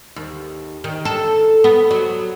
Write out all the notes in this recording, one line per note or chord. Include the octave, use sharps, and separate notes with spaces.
D#2
D#3
A4
B3
F#3